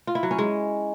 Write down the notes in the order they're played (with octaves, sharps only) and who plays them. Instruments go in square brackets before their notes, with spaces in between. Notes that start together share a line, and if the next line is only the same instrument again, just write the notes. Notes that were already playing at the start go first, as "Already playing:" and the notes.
[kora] F4
E4
F#3
C#4
G#3